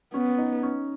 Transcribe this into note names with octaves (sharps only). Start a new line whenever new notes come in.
B3 C#4
D#4
C#4